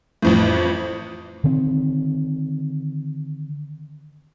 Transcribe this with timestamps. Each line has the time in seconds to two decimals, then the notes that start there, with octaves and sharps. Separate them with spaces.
0.22 A1 F2 A2
1.44 D3 D#3 C4